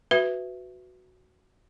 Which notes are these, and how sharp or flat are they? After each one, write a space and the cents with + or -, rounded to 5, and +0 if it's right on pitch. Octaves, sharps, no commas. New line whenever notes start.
F#4 +0 B4 +10 E5 +10